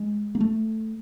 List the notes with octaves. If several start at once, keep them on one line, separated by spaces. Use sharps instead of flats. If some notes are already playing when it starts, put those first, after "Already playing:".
Already playing: G#3
A#3
A3